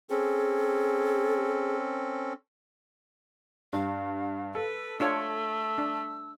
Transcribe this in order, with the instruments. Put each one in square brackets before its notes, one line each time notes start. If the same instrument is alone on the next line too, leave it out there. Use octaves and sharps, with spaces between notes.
[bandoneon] C4 C#4 A4 [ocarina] G#4
[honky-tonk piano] G2 [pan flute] F5
[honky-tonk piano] A4 [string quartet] B4
[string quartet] A3 [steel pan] D4 F4 C#5 [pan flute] E6
[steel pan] D4